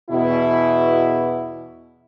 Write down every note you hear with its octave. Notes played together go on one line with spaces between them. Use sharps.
E2 B2 E4